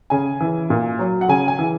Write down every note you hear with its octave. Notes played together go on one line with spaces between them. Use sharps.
C#3 G#5
E3
A#2
F#3
F#5
C#3 G#5
G#5
E3